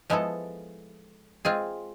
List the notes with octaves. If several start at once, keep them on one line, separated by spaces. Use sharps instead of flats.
F3 G#3 B3 E4 A4
G#3 C4 F4 G#4